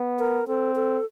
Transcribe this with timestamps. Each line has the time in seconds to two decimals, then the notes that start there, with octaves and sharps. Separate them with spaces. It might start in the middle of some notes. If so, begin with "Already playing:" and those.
Already playing: B3
0.19 A#4
0.47 C4 A4
0.76 A4